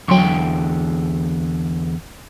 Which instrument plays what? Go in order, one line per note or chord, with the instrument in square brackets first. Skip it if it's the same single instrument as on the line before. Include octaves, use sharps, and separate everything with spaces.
[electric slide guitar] E2 D3 G5 [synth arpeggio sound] F#3 C6 C#6